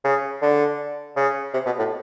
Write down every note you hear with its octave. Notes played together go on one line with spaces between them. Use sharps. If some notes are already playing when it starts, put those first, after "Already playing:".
C#3
D3
C#3
C3
B2
A2